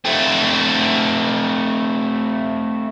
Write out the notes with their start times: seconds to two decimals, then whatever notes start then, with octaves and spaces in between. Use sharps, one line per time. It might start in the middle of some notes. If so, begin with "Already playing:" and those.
0.05 A3 C4